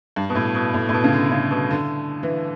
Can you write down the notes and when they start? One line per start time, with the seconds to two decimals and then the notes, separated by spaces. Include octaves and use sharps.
0.16 G2
0.30 B2
0.35 A2
0.55 B2
0.74 A2
0.89 A2
0.94 B2
1.04 C#3
1.13 D3
1.32 C#3
1.51 B2
1.71 D3
2.23 E3